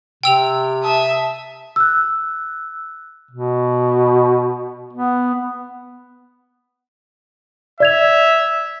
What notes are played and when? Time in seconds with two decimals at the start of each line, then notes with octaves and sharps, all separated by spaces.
0.23 C3 G5 E6 F7
0.83 E5 A5 D#6
1.76 E6 F#6
3.31 B2
4.93 B3
7.80 D5 E5 G#6 F7